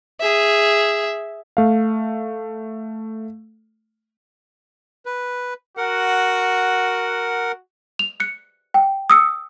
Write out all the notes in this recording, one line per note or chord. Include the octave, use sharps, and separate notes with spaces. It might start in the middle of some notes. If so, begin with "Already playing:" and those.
G#4 E5
A3 F5
B4
F#4 A#4 F#5
F7
F#6 C#7
G5
D#6 E6 C#7